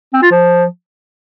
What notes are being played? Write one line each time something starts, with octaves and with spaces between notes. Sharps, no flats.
C4
F4
F3